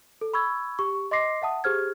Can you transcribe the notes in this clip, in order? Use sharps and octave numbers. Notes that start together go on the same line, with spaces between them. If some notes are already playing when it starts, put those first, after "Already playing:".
A4
B5 C#6 E6 G#6
G4 C#6
D#5 C6 D6 A#6 C7
E5 F#5 A5 D#6
G4 G#4 C5 F6 G#6